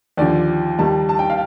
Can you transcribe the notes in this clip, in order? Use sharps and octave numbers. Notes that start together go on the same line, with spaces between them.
D#2 D3 F3 D5
D#2 D#3 G3 A5
A5
G5
F5